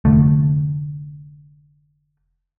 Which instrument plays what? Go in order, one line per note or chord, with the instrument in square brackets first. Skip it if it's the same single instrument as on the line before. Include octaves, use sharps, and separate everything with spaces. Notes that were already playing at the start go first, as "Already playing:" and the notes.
[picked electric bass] F1 D3 A3